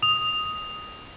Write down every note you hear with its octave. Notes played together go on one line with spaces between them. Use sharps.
D#6 F7